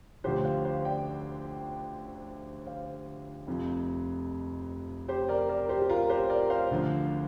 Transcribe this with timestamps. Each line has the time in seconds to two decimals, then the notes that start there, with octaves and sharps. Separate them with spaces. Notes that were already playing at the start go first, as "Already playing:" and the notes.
0.24 D2 D3 F3 G4 C5
0.44 C5 F5
0.65 C5 F5
0.85 D5 G5
2.66 C5 F5
3.47 F1 F2 F3
5.08 G4 C5
5.29 A#4 D5
5.49 A#4 D5
5.69 G4 C5
5.82 G4
5.89 F4 A#4
6.10 G4 C5
6.30 A#4 D5
6.50 C5 F5
6.71 D2 D3 F3